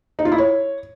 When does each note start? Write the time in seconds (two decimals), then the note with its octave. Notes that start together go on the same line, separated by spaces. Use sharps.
0.19 D#4
0.25 F4
0.32 E4
0.38 C#5